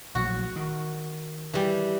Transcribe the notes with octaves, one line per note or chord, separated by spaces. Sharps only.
A#1 A2 F#3 F#4
D#3
E3 G3